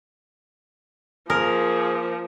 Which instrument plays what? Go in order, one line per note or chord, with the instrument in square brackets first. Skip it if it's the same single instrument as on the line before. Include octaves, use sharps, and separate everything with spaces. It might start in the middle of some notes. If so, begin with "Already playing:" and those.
[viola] F3 [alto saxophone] A#3 [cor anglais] G#4 [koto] A#4